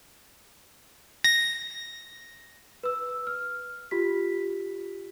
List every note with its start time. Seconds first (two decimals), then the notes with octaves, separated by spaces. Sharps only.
1.24 A#6
2.83 B4 E6
3.27 F6
3.91 F4 G4 B6